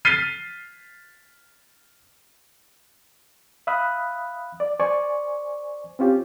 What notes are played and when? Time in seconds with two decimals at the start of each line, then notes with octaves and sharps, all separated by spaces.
0.05 F6 A6 B6 C7 D#7 G7
3.67 E5 F5 B5 D#6 F#6
4.60 D5
4.80 C5 D5 G#5 C#6
5.99 C4 C#4 F4 G4